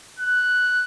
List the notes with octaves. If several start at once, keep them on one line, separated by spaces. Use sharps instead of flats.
F#6